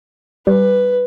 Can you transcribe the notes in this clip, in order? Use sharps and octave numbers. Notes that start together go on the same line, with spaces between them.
G3 B4